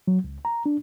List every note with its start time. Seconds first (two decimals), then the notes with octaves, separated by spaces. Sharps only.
0.08 F#3
0.24 C#2
0.45 A#5
0.66 D4